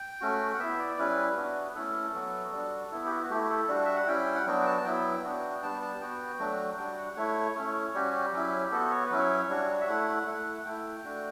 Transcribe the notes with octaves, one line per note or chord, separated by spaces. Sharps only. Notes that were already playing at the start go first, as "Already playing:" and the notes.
Already playing: G5
A3 C#4 F#4
F#5
B3 E4 E5
D5
G3 C#4 E4 B4
B3 D4 F#4
A3 C#4 E4 A4
F#3 B3 F#4
G3 D4 F#4
B3 E4
G4
F#4
F#4
A3 E4 G4
A4
G3 D4 F#4
E5
F#5
G3 C#4 E4 G5
F#5
F#3 B3 D4 F#4 G5
G5
A5
A5
F#3 B3 E4 G5
B3 D4 F#4
G3 B3 D4 A5
A5
B3 F#4 G5
F#3 A3 D4 F#4
G3 D4 F#4 G5
F#5
A3 E4 C#5
A3 C#4 E4
G3 C#4 F#4 G4
F#3 C#4 E4
B3 F#4 A4
C#5
B4
F#3 C#4 E4
C#5
G3 D4 F#4
E5
A3 E4 F#5
A3 E4
A3 E4 G5
A3 D4 F#4